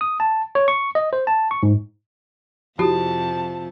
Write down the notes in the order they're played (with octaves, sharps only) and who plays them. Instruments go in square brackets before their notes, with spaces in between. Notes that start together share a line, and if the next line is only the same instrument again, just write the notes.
[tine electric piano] D#6
A5
C#5
C#6
D#5
C5
A5
C#6
G#2
[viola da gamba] F2 C3 [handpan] F3 [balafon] E4 F#4 G4 [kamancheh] A5